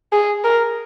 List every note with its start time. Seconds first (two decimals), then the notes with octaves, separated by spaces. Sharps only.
0.12 G#4
0.44 A#4